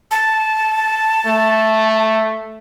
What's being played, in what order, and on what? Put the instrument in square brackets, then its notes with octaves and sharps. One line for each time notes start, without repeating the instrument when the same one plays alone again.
[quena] A5
[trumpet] A3